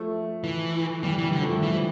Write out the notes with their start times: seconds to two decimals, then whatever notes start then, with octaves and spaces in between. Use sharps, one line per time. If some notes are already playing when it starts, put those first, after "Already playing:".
Already playing: F3 A3
0.44 E3
1.03 E3 G3
1.18 E3 G3
1.33 D3
1.42 F3 A3
1.63 E3 G3
1.75 F3